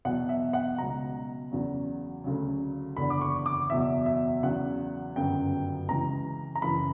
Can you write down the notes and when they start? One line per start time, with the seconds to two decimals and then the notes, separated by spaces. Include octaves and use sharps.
0.05 E2 B2 F#3 F#5
0.29 E5
0.53 F#5
0.78 C#2 B2 F#3 A#5
1.51 E2 C#3 F#3
2.24 D2 C#3 F#3
2.97 F#1 E2 D3 B5
3.10 D6
3.21 C#6
3.46 D6
3.70 F#1 E2 B2 F#3 E5
4.06 E5
4.43 E2 C#3 F#3 F#5
5.16 G1 F#2 C#3 F#3 G5
5.89 C#2 C#3 E3 A#5
6.55 A#5
6.61 F#1 F#2 C#3 E3 B5